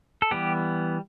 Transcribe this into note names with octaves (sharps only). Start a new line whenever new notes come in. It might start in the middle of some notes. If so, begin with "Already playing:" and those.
A4
E3 G3 B3 G4